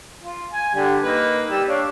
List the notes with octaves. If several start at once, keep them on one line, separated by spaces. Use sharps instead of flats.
F4
G#5
D3 G3
A#3 D#4 B4
G3 E6
D4 C#5 F5